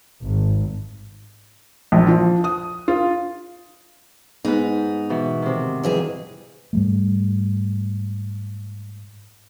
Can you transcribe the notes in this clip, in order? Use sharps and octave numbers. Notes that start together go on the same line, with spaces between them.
G#1
A#1
F3
D#6
F4
G#2 B3 D#4 B4
B2 E3 F#4
C3 D#3
F2 E3 G#4
G#2 G3 A3